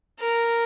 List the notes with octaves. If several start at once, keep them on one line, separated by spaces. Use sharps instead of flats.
A#4